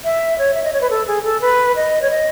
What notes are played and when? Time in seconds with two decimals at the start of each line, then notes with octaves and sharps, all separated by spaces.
0.04 E5
0.39 C#5
0.54 E5
0.64 D#5
0.73 C#5
0.81 B4
0.90 A4
1.07 G#4
1.24 A4
1.41 B4
1.76 D#5
2.02 C#5
2.10 D#5